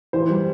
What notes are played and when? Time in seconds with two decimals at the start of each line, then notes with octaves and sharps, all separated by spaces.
0.13 E3 C5
0.30 G3